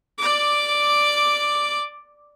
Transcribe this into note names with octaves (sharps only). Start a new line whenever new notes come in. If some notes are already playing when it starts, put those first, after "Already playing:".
D5 D6